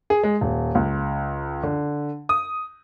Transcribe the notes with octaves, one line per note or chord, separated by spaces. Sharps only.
G#4
G#3
D#1
C#2
D3
D#6